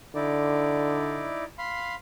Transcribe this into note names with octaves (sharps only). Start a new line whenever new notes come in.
D3 D#4 E4 D5
F5 B5 C6